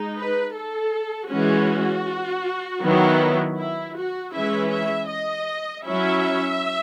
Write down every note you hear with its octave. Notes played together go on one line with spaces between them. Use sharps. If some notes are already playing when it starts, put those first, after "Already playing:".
Already playing: G#3 D#4
B4
A4
E3 G#3 C#4 F#4
D#3 F#3 B3 E4
E4
F#4
E3 G#3 C#4 E4 E5
E5
D#5
F#3 C#4 E4 E5